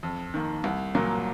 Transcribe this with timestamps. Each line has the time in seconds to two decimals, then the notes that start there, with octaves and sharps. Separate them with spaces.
0.03 F2
0.34 D#3 A#3
0.64 C2
0.95 A#2 F#3 A#3